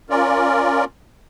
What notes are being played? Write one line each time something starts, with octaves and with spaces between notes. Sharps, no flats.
C#4 F4 A#4 D5